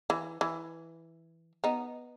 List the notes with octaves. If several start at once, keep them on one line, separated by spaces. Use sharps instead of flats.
E3
E3
B3 D#4